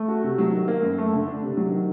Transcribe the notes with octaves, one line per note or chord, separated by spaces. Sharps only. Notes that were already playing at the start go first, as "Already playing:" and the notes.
Already playing: A3
F#4
C3
F#3
D#3
A#3
F#2
A3
D3
D4
C3
F#3
D#3